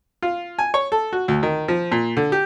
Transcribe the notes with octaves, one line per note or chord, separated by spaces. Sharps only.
F4
G#5
C#5
A4
F#4
D2
D#3
F3
A#2
D3
G4